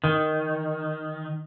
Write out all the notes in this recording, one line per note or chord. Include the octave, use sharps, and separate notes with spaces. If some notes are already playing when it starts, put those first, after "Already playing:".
D#3